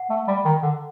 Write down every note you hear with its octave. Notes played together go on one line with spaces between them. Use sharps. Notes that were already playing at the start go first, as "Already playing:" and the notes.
Already playing: F#5
A3
G3
D#3
D3